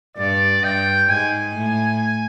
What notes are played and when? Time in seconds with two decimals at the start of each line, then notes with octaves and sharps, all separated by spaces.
0.17 G2 D5
0.63 G2 G5
1.10 G#2 G#5
1.55 A2